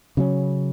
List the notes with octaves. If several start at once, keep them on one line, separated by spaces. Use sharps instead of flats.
C#3 F#3 C#4